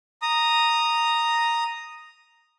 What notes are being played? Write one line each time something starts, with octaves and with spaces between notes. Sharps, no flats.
A#5 D#6